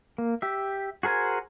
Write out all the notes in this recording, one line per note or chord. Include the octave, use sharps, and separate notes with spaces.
A#3
G4 E5
F#4 G#4 A#4 C5 G#5